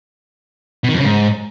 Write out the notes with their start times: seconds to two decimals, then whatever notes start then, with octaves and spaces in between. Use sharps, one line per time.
0.84 B2
0.89 D#3
0.94 F2
0.99 C#3
1.04 G#2